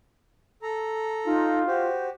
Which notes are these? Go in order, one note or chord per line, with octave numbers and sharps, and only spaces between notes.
A4 A#5
D#4 F4
F#4 G4 C5